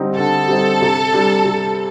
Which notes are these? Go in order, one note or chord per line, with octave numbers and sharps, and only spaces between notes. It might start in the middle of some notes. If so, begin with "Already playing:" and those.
Already playing: D3 G3 C4 D#4
D3 A4
G3 C4 D#4
C3
G3 D4
C3